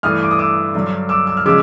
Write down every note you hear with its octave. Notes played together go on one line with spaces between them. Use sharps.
G2 E3 A3 D#6 F6
D6
D#6
D6 E6
G2 D3 F#3
D6 E6
E6
F6
C#3 F3 G#3 D6 E6